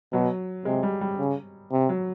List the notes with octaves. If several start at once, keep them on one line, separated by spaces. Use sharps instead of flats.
B2 F#3
C3 G#3
G3
G3
C#3
C3
F#3